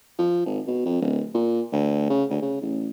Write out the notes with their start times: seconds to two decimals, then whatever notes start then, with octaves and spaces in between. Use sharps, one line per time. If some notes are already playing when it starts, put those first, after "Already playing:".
0.19 F3
0.45 G#1
0.67 B2
0.86 F2
1.01 D1
1.34 A#2
1.72 D2
2.10 C#3
2.30 D2
2.42 C#3
2.61 A1